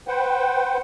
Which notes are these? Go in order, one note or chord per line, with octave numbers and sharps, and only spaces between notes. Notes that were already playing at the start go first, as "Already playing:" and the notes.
B4 C5 F#5 G5